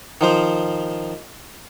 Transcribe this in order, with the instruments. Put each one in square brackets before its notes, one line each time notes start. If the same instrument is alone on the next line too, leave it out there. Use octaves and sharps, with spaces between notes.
[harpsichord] D#3 F3 C5